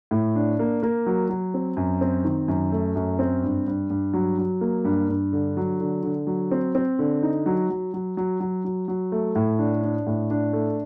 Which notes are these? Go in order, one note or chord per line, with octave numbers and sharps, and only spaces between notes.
A2
D4
A#3
A#3
F#3
F#3
C4
F#2
C4
D#3
F#2
A3
F#2
C4
G2
G2
G2
F#3
F#3
A#3
G2
G2
D3
F#3
D3
D3
F#3
C4
C4
D3
D#4
F#3
F#3
F#3
F#3
F#3
F#3
F#3
A3
A2
D4
D4
A2
D4
A3